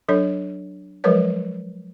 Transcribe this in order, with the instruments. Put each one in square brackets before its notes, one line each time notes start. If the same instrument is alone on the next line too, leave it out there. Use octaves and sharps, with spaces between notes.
[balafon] F#3 D4 A4 C#5
F3 F#3 G#3 A#4 B4 C#5